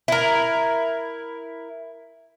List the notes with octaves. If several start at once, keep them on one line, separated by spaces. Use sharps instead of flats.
E4 A#4